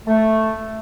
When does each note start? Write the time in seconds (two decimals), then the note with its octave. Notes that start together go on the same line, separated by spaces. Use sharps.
0.08 A3